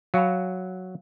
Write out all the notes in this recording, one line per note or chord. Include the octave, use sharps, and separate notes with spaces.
F#3 F#4 F5 G#5 B5